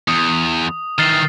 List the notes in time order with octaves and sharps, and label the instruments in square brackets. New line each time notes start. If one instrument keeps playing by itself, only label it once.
[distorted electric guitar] E2 [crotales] D#6
[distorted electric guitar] D#3 E3 [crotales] F6 A6 C7